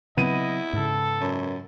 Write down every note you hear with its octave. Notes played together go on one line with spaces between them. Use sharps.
C#3 F#3 B3 C4 E4 D#5 D#7
G#2 C#3 A4
F#2